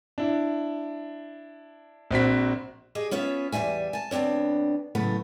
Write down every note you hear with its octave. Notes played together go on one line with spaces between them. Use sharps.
D4 E4
A#1 C4 F#4 B6
G4 G#4 D#5
B3 C#4 F4 C#5 E5
E2 G#2 G3 E5 G#5
G#5 A5
D2 B3 C4 D4 C#5
A2 C#3 F#3 A3 B3